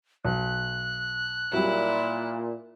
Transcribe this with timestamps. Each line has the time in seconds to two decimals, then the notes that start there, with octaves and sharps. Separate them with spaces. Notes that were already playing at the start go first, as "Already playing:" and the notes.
0.25 B1 F#6
1.53 A#2 F#3 G3 E4